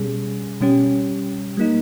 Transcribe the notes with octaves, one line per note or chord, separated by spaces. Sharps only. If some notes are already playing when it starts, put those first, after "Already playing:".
Already playing: B2 G3 C#4 G#4
B2 G3 C#4 G4
G3 A#3 D#4